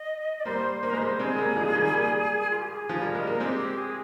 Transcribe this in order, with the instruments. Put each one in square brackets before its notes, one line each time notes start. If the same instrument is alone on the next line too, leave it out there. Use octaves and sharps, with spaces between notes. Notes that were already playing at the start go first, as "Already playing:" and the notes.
Already playing: [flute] D#5
D5
[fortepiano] G3 A#3 [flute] C5
[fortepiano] A#3 [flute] C5
[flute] A#4
[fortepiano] G#3
[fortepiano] G3 A#3 [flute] C5
[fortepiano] G#3 C4 [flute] G#4
[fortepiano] G3 A#3
F3 G#3
D#3 G3
G3 A#3
[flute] F4
G4
G#4
[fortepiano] F3
[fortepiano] G3 [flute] A#4
[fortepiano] G#3
A#3
[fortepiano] G#3 C4 [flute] G4
[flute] G4
G#4